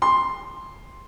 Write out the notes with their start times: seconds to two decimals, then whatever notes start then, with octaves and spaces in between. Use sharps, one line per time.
0.02 C6